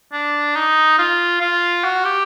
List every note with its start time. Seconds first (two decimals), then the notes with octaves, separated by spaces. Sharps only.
0.13 D4
0.56 D#4
0.99 F4
1.41 F4
1.84 F#4
2.05 G4